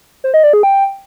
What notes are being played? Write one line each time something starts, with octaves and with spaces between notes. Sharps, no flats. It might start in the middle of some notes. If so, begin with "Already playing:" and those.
C5
D#5
D5
G#4
G5